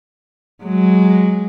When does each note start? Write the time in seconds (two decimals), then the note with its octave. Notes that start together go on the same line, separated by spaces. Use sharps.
0.63 F#3 G#3